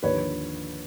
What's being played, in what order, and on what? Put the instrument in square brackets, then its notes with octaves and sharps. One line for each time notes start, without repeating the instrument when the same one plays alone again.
[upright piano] D#2 D3 F3 B4 C#5